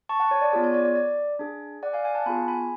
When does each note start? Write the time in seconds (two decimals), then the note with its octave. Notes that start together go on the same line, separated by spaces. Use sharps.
0.09 A5 C#6
0.20 F#5 A5
0.31 C#5
0.41 D5
0.52 B3 F4 G#4 C#5
0.64 C#5
0.74 D5
0.85 D5
0.95 D5
1.39 D4 G#4
1.83 D5 F#5
1.93 F5 G#5
2.04 F5 G#5
2.15 F#5 A5
2.26 B3 F4 G#4 G#5 B5
2.48 G#5 B5